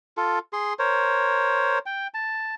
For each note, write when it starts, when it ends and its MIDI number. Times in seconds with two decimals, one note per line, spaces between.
0.17 0.39 65
0.17 0.39 69
0.53 0.73 68
0.53 0.73 84
0.79 1.78 70
0.79 1.78 72
0.79 1.78 73
1.86 2.07 79
2.14 2.55 81